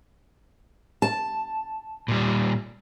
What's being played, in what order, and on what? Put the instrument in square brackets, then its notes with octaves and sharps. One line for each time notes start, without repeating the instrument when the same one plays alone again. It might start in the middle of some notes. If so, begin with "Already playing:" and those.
[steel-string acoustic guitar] A5
[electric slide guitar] A#2 G3